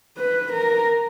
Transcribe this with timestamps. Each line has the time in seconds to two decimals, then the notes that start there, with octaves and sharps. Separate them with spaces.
0.18 B4
0.53 A#4